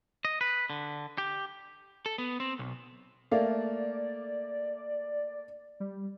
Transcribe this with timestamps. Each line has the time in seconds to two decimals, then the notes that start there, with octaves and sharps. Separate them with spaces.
0.25 D#5
0.41 B4
0.70 D3
1.18 G4
2.06 A4
2.18 B3
2.40 C4
2.59 B1
3.31 A3 A#3 D5 F5
5.80 G3